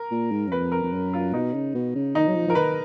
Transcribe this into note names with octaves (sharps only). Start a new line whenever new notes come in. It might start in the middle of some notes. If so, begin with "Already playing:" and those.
Already playing: A#4
A#2
G#2
F#2
F2 B4
A#4
F2
F#2
F4
B2 D#4
C#3
B2
C#3
D#3 D#4
F#3
F3
F3 A#4
D#3 B4